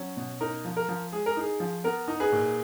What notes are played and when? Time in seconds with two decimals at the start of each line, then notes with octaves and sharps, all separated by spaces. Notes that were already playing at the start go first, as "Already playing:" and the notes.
Already playing: F#3 C#4
0.17 B2
0.41 D#4 A#4
0.65 F3
0.77 A#4
0.88 F3
1.12 G#3 G#4
1.26 A#4
1.37 D#4 G#4
1.60 F3
1.84 B3 A#4
2.08 D#4
2.20 G#4 B4
2.32 A#2